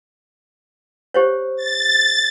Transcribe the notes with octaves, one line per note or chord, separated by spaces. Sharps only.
G4 C5 C#5
A6